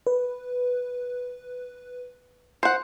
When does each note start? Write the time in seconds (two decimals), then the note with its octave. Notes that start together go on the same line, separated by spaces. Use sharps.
0.07 B4
2.63 C5 F#5